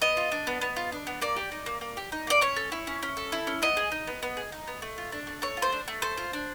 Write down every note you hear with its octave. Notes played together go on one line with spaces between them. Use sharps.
B3 D#5
F4
D4
B3
B3
F4
D4
B3
A#3 D5
G4
D#4
A#3
A#3
G4
D#4
A#3 D5
C#4 C#5
A4
E4
C#4
C#4
A4
E4
C#4
B3 D#5
G#4
D#4
B3
B3
G#4
D#4
B3
A3
F4
D4
A3
A3 C#5
F4
C5
D4
A3
A4 C5
F4
D4